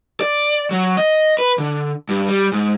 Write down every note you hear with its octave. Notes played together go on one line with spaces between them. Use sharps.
D5
F#3
D#5
B4
D3
G2
G3
G#2